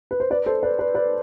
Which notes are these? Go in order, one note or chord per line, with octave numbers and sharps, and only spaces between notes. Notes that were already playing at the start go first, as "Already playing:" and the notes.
B4
C5
B4 D5
A4 C5
B4 D5
B4 D5
B4 D5